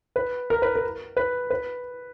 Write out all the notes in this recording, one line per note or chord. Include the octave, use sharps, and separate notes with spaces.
B4
A#4
B4
A#4
B4
B4